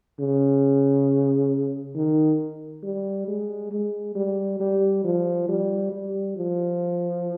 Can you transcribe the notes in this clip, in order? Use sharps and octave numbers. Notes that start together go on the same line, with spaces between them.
C#3
D#3
G3
G#3
G#3
G3
G3
F3
G3
G3
F3